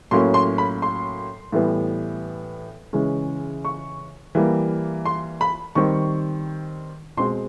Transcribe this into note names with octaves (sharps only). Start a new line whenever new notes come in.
A2 F#3 A#3 C#4 C6
C6
B5
C6
A2 E3 G3 B3
C#3 E3 G#3 C#4
C#6
E3 G3 A#3
C6
B5
D#3 G3 C4 C#6
B2 G#3 C4 C6